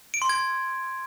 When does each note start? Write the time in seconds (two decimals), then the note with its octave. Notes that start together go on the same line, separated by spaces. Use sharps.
0.14 D7
0.22 C6
0.29 G#6